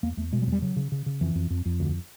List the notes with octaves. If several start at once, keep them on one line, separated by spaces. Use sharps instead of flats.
E2 A#3
E2 A3
B2 G#3
G3
E2 F#3
G3
C#3 F#3
C#3
C#3
C#3
F2 E3
F2
F2
F2
D2